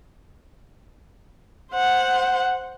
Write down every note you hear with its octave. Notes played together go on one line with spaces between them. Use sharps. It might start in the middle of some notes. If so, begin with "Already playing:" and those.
C5 F#5